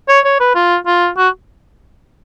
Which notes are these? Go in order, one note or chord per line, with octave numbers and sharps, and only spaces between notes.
C#5
C#5
B4
F4
F4
F#4